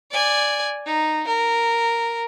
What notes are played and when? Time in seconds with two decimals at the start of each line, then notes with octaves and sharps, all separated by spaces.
0.11 D5 G#5
0.86 D#4
1.27 A#4